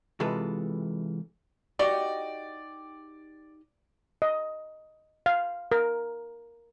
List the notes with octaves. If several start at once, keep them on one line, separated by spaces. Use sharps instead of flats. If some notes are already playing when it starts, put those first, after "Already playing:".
C3 E3 G#3 F4 A4 B4
D#4 F#4 G4 D5
D#5
F5
A#4